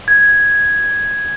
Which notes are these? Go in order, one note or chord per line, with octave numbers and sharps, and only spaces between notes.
G#6